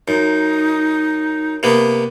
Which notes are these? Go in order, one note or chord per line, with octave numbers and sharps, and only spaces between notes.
F#2 D#4
C3 A#3 B3